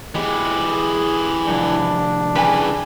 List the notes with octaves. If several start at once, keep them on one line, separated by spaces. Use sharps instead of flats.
E3 G#3 B3 G4
G#4
C2 F2 D4
C#3 E3 B4 G5 G#5